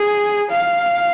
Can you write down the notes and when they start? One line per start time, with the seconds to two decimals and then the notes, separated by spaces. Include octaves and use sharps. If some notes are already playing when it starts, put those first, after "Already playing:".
Already playing: G#4
0.51 F5